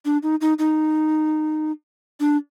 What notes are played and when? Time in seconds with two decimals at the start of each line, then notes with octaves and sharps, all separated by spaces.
0.05 D4
0.23 D#4
0.41 D#4
0.59 D#4
2.20 D4